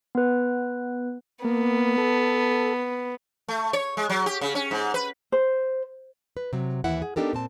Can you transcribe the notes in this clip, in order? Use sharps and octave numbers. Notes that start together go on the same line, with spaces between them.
B3 B4
A#3 B3
A4
A3
C#5
G#3
F#3
G4
C#3
C#4
G#2
B4
C5
B4
C3 F#3
D#2 E3 E4 F#5
G#4
B3 D4 D#4 G4 A4 A#4
A#2 C4 A5